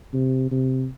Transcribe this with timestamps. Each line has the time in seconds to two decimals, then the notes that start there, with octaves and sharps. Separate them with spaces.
0.13 C3
0.51 C3